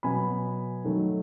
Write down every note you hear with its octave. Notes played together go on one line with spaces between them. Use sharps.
B2 F#3 B3 G#5 B5
D#3 F#3 A3